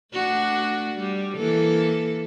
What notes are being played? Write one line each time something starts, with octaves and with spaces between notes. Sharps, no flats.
A3 D4 F#4
G3
E3 A#3 A4